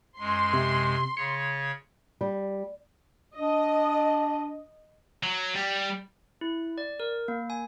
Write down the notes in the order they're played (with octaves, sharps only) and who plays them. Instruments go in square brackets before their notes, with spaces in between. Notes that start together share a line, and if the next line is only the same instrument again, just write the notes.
[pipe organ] F#2 G#3 [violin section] C6
[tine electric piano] C3
[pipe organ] C#3 C#5 [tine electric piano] C#7
[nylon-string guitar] G3
[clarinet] D4 [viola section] D#5
[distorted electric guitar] F#3
G3
[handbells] E4
D5
A#4
A#3
G#5